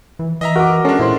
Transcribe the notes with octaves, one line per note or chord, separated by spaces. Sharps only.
E3
E3 D#5 E5 A#5
F#4 A#4 F#5 D6
G#3 C#4 D4 A4
A#2 E4 C5 C6